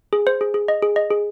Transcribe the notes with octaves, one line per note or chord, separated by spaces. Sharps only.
G#4
C5
G#4
G#4
D#5
G#4
D#5
G#4